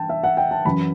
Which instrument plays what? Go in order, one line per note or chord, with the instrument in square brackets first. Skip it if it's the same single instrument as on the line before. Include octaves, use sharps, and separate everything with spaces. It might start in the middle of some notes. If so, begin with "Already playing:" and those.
Already playing: [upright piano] G2 E3 G5 A5
E5
F#5
G5
A5
F#2 E3 B5